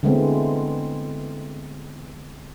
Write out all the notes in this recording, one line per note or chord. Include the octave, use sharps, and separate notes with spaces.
D3 E3 G#3 A3 B3 C4